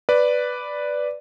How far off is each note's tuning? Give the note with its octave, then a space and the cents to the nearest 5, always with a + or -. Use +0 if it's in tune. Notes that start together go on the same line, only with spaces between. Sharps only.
B4 +0 D5 +0